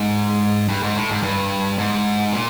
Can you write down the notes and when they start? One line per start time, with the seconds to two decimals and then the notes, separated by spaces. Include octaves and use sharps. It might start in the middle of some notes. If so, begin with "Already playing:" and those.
Already playing: G#2
0.69 G2
0.83 G#2
0.95 A2
1.10 G#2
1.23 G2
1.78 G#2
2.33 A#2